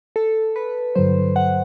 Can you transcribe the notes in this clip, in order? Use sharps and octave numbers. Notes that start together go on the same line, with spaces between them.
A4
B4
G2 D3 F#3 C5
F#5